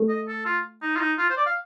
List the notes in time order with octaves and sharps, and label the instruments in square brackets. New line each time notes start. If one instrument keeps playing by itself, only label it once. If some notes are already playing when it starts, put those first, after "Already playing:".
Already playing: [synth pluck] A3
[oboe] D#5
A4
F4
D#4
F4
D#4
F4
C5
D5
F5